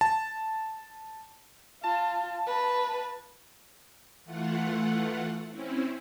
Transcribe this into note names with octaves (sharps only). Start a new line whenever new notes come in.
A5
F4 A5
B4
E3 A3 F4 F#5
C4 C#4 E4